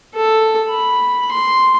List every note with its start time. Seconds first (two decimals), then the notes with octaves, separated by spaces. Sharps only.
0.15 A4
0.69 B5
1.32 C6